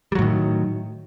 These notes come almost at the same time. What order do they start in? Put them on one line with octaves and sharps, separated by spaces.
G3 F#3 A2 D#3